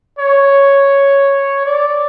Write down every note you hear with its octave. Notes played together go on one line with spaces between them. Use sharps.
C#5
D5